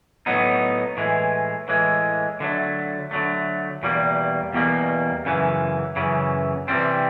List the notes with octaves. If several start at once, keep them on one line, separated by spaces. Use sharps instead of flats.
A2 F#3 B3 D#4
A2 E3 G#3
A2 E3 G#3
D3 F#3 A3
D3 F#3 A3
E2 B2 G3 A#3
E2 B2 G3 A#3
F#2 C#3 E3
F#2 C#3 E3
C3 E3 G3 C4